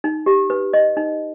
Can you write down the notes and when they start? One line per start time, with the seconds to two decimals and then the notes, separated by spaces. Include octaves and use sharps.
0.04 D#4
0.26 G4
0.50 B4
0.73 D#5
0.97 D#4